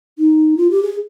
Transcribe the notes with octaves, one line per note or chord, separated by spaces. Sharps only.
D#4
F4
G4
G#4